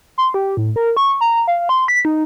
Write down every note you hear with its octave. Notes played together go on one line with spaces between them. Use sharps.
C6
G4
A2
A#4
C#6
A#5
F5
C6
B6
D#4